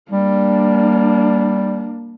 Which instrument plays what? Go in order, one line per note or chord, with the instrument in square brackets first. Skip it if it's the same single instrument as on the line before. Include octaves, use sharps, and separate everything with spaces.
[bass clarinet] G3 [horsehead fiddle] A#3 D4